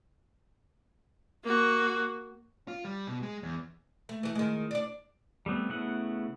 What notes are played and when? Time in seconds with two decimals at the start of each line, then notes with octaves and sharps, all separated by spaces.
1.44 A#3 F#4
2.68 F4
2.85 G3
3.07 B2
3.23 G#3
3.43 E2
4.09 A3
4.23 E3 A3
4.35 D#3 G#3
4.71 D4 D5
5.46 G3 A3 B3 C4
5.69 C#3 A3 B3 E4 F#5